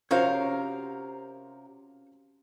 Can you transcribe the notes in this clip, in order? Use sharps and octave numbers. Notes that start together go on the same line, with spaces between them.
C3 F3 C#4 F#4 A#4 C5 C#5 F5